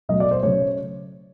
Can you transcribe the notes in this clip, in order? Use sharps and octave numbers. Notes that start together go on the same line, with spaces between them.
B2 F#3 A3 D#5
D5
C5
C#3 F#3 A3 C#5